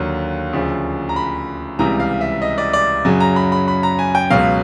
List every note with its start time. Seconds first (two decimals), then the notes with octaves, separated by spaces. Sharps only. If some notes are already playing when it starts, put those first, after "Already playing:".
Already playing: D#2 D3 F#3
0.53 D2 C#3 F3
1.09 A#5
1.16 B5
1.79 C#2 C3 E3 G3 A#5
2.00 F5
2.21 E5
2.42 D#5
2.58 D5
2.73 D5
3.05 F#2 C#3 F#3 G#5
3.20 A#5
3.36 B5
3.52 B5
3.68 B5
3.83 A#5
3.99 G#5
4.15 G5
4.30 C#2 B2 F#3 F5